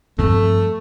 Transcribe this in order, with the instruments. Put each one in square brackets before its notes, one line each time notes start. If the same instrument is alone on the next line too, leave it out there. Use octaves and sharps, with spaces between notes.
[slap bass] G2 F3 C4 [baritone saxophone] A3